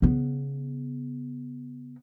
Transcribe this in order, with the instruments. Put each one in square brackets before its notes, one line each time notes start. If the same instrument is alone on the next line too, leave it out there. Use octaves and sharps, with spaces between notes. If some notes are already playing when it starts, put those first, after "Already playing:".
[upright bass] C#3 B3